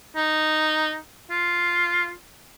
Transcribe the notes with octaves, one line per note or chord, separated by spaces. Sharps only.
D#4
F4